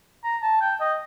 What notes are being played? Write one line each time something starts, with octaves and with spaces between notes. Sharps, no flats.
A#5
A5
G5
D#5